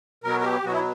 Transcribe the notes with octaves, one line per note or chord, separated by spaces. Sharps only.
B2 F#3 B3 A#4
A#4
G4
B2 F#3 B3 F#4
E4